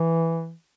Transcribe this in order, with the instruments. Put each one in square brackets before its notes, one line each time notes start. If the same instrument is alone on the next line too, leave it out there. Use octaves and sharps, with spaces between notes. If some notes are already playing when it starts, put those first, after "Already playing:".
Already playing: [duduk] E3